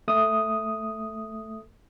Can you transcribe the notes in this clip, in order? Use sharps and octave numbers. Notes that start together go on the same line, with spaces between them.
A3 D#6